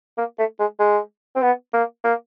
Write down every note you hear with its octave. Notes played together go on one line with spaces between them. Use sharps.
A#3
A3
G#3
G#3
C4
B3
A#3
A#3